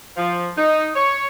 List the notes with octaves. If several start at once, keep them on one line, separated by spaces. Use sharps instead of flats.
F3
D#4
C#5